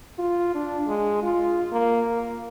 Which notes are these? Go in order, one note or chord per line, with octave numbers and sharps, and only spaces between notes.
F4
D4
G#3
F4
A#3
A#3